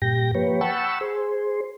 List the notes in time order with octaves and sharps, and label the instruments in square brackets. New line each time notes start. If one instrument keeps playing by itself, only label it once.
[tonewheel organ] G2 A#2 G4 G5 A#6
F3 A#3 G4 B4 C#5
F#5 G5 A5 B5 C#6 E6
G#4 C5